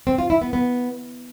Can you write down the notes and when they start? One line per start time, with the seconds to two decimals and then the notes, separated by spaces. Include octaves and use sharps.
0.07 C4
0.18 F4
0.30 E4
0.42 B3
0.53 B3